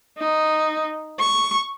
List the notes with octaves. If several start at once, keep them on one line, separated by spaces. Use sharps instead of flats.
D#4
C#6